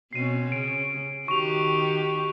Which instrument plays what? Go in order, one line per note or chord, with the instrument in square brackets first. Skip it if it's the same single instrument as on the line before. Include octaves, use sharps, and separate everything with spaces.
[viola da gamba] B2 C4 C#4 [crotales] C7 D#7
[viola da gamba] C#3 [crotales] D7
[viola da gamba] D#3 F#4 G4 [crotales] C#6 F7